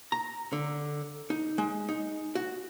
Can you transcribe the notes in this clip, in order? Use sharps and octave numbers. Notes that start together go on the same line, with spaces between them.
A#5
D3
D#4
G#3
D#4
F#4